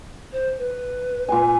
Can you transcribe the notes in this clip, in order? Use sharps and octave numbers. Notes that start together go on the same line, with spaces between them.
C5
B4
A#2 G#5